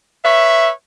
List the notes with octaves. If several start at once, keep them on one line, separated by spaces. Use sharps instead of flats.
B4 C#5 E5